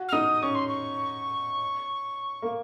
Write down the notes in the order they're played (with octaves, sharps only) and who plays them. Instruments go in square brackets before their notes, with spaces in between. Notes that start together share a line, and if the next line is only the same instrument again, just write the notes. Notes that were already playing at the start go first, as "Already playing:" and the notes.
Already playing: [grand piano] F#4
[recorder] F6
[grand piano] D#4 [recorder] D#6
[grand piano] C#4 [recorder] C#6
[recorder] C6
C#6
[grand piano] A#3